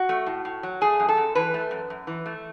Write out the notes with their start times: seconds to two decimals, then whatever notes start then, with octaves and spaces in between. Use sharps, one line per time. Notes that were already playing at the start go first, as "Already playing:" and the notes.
Already playing: F#4
0.09 A3
0.26 A2
0.45 A2
0.63 F#3
0.81 A3 G#4
1.00 F#2
1.09 A4
1.17 F#2
1.35 E3 B4
1.54 A3
1.71 F#2
1.90 F#2
2.07 E3
2.26 A3